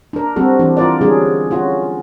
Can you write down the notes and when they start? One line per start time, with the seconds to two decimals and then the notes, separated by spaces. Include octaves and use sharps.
0.13 D4 A#4
0.36 G3 C4 F#4 A4
0.59 E3 D4
0.77 F4 A#4 D5
1.01 D3 G3 C#4 D4 G#4
1.51 C#4 F4 F#4